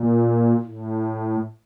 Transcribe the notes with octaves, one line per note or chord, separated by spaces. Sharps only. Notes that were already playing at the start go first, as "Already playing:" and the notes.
Already playing: A#2
A2